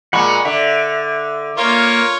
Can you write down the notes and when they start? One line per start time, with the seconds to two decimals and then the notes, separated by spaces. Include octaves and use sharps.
0.13 A#2 G#3 F#5 B5 C#6
0.45 D3 E5
1.58 A#3 F4 C#5